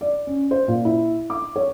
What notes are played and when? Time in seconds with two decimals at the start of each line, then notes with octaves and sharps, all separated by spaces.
0.01 D5
0.27 C#4
0.51 C5
0.68 A#2
0.85 E4
1.30 D6
1.56 C#5